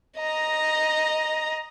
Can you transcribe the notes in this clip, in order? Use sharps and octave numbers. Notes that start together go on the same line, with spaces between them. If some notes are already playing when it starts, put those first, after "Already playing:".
D#5 A#5